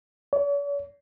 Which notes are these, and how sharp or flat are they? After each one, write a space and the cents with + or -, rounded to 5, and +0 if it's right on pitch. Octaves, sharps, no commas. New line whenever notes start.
C#5 +45